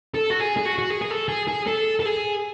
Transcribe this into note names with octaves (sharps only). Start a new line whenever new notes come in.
A4
F#4
G#4
G#4
F#4
F#4
G#4
G#4
A4
G#4
G#4
A4
A4
G#4